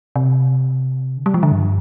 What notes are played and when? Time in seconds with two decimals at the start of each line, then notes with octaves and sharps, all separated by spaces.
0.16 C3
1.17 D3
1.26 G3
1.34 F3
1.43 D3
1.52 G2